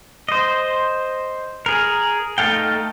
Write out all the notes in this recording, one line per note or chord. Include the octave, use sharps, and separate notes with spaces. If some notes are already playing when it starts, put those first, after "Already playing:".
C5 D#5
G#4 A#4
A3 D#4 A4 F5 G5